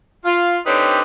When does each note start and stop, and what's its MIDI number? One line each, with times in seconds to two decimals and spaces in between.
0.24 0.58 65
0.66 1.02 50
0.66 1.02 60
0.66 1.02 63
0.66 1.02 67
0.66 1.02 71
0.66 1.02 73